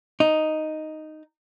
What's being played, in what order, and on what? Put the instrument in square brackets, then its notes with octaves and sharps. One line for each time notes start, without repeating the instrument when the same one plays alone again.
[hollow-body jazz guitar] D#4